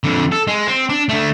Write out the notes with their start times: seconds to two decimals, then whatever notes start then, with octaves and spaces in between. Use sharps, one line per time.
0.04 F2 D3
0.32 A4
0.48 G#3
0.67 C4
0.89 D4
1.09 D3 A3